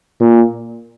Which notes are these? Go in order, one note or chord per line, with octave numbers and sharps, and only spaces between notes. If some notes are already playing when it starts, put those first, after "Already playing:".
A#2